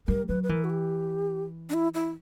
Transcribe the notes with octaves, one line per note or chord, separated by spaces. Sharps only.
G3 A#4
F#3 B4
B4
E3 A#4
F#4
G4
D4
E4
E4